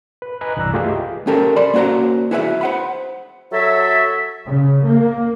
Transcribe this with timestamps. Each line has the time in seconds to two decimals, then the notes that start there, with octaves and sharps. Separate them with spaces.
0.22 B4
0.41 B4 D#5 G#5 A#5 F#6
0.57 C2 G2 E3 D5 A#5 E6
0.74 A3 F4 G4 G#4 B4 D#5
1.27 C#4 G4 A4 A#4 C5
1.56 D5 B5 C6
1.74 A#3 C#4 F#4 C5 A#5
2.31 E4 F#4 G#4 B4 C5 E5
2.61 C5 F#5 B5
3.52 F#3 A4 C#5 E5
4.46 C#3
4.85 A#3